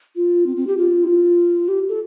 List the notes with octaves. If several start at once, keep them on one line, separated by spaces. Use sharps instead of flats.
F4
C4
C4
G4
F4
E4
F4
G4
A4